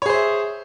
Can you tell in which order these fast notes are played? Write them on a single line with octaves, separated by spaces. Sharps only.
C#5 G#4 C5 E5